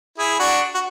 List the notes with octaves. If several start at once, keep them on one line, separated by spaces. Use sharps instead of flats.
E4 G#4
D4 F#4
F#4